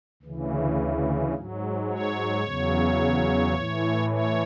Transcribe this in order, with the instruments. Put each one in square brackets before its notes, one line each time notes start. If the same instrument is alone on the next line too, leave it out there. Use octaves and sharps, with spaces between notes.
[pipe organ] D2 C#3 E3
G#2 F#3
C#5
E2 C#3 F#3
A2 E3
C#5